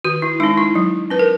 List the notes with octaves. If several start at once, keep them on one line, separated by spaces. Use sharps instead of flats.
D#3 F#4
E4
G#3 C#4 D#4
E4
F#3
C#4 B4
A#4